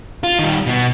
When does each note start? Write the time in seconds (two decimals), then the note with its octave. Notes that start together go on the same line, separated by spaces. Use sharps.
0.24 F4
0.39 D#3 G3
0.67 B2